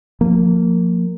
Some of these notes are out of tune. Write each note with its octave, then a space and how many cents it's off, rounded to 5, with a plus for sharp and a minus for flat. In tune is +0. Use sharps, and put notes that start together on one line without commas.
F3 +25 A#3 -20